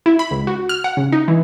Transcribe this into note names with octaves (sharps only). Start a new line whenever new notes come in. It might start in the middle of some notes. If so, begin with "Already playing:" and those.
E4
B5
C#2
F#4
F6
F#5
C#3
D#4
E3